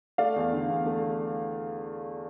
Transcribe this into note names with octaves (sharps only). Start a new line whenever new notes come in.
A3 D5 F5
E2
D3
E2
A3